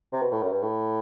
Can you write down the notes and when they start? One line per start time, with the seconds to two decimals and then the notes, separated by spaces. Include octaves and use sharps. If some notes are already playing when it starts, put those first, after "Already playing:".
0.13 C3
0.22 B2
0.32 A2
0.42 F#2
0.52 G2
0.62 A2